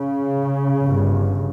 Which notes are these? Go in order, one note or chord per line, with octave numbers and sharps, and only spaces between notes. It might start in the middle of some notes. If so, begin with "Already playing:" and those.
Already playing: C#3
G1 G2